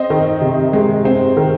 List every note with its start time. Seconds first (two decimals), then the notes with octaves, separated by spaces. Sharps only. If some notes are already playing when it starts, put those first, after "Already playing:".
Already playing: C4 D#5
0.10 D#3
0.41 C3
0.73 G#3
1.05 C4
1.37 D#3